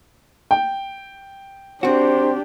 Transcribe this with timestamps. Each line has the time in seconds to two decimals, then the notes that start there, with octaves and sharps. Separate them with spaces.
0.51 G5
1.83 C4 D4 F#4 G4 C5